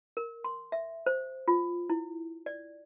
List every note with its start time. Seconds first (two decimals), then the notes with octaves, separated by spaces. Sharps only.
0.17 A#4
0.44 C6
0.72 E5
1.06 C5
1.48 F4
1.90 E4
2.46 D5